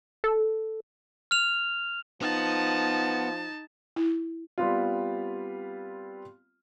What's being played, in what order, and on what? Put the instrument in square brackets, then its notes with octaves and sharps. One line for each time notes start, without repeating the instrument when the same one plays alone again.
[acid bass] A4
[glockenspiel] F6 F7
[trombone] F3 [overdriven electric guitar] B3 [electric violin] D#4 A5
[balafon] E4
[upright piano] G3 B3 C4 F4